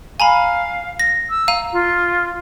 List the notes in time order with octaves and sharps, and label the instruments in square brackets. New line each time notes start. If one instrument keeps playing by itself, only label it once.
[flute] F5 [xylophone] G#5 A#5 B5
[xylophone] A#6
[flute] E6
[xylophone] F5 A#5 D#7
[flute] F4